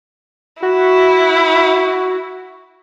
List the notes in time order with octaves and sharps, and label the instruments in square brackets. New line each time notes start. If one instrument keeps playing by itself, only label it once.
[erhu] E4 [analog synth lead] F#4